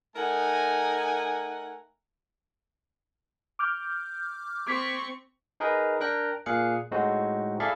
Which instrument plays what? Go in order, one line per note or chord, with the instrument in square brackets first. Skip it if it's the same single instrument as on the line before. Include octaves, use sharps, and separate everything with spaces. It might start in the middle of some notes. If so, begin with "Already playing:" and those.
[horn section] A3 D#4 A#4 F#5 G#5
[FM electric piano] D6 F6 G6
[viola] C4 C#6 [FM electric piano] D6 G#6 B6
[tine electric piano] D#4 G#4 A#4 B4 D#5
D4 A#4 G5 F#6 A#6
A#2 G#4 F5 F#6 C#7
A2 G#3 C4 D#4 F#4
E4 G#4 A4 D5 E5 F5